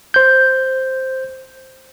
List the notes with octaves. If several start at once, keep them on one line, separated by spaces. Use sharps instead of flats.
C5 G6